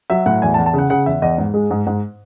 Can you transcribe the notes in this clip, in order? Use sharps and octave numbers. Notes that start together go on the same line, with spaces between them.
F#3 E5
A2 F#5
E2 G#5
A5
E2
A5
C#3 F#5
C#3 F#5
E2 E5
E2 D#5
G#2
G#3
G#2
G#2